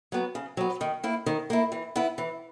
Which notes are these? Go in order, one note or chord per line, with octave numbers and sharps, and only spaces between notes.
F#3 B3
C#3
F#3 B3
D#3
A#3 E4
D#3
A#3 E4
E3
B3 E4
E3